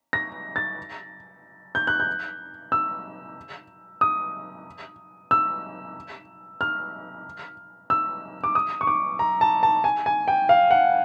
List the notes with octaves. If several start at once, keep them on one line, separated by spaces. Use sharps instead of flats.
A#6
A6
G6
F#6
G6
E6
D#6
E6
F6
E6
D6
D#6
C#6
D6
A#5
A5
A5
G#5
G#5
G5
F5
F#5